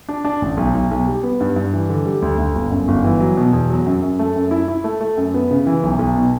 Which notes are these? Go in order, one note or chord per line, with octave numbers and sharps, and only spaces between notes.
D4
D4
A1
B1
B1
B1
G3
B3
G2
G2
E3
D3
G3
D2
D2
G1
F#2
G1
E3
F#3
B2
E2
F#3
F#2
F#2
A3
F#2
E4
E4
A3
A3
F#2
B3
C#3
E3
B1
B1
B2